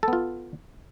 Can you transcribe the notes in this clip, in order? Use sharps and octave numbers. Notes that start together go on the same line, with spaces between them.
B3 F4 A4